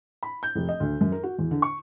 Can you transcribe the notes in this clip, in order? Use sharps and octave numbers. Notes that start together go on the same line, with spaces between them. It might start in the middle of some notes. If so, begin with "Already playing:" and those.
B5
G6
F1
D#5
D2
F#2
A#4
F#4
E2
D3
C#6